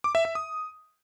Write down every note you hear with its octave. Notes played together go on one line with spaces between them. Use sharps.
D6
E5
E5
D#6